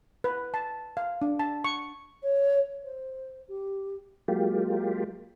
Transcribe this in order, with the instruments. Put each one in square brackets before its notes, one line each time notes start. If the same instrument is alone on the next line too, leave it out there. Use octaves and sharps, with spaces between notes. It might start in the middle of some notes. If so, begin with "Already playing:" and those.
[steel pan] B4
A5
F5
D4
A5
C#6
[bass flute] C#5
C5
G4
[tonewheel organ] F#3 G#3 A#3 F4 G4